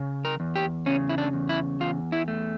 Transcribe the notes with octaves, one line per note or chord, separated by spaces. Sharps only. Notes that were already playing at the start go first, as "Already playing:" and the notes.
Already playing: C#3
A#4
E2
G4
C#3 C#4
E4
D4
E2
E4
E2 F4
E4
A3